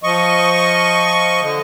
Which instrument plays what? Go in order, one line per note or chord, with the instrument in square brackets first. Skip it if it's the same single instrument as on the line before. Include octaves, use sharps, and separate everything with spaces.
[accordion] F3 D#5 C#6
D3